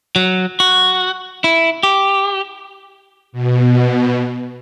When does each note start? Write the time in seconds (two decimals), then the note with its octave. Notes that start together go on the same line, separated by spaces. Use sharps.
0.16 F#3
0.60 F#4
1.44 E4
1.83 G4
3.32 B2